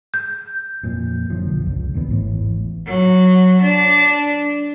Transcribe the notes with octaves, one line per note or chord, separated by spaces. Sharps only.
G6
F2 A#2
F#2 D3 F3
B1
C#2
E2 D#3 E3 B3
G#1 A2 E3
F#3
D4